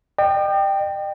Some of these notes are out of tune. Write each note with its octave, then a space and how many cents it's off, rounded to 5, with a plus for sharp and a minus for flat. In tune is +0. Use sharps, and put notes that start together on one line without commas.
D#5 -45 G5 +0